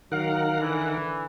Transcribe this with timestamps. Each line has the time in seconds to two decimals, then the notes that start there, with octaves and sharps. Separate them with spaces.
0.12 D#3 F#3 A#4 F5 F#5
0.60 D3 E3